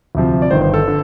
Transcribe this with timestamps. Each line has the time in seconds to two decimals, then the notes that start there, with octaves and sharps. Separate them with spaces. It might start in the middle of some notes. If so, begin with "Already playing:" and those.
0.15 D2 C3 F3
0.42 D5
0.50 G1 G2 D#3 C5
0.62 C5
0.74 A4
0.88 D3